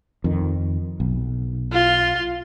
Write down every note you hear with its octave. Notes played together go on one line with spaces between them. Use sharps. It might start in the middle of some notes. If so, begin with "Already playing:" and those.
F2 D#3
B1
F4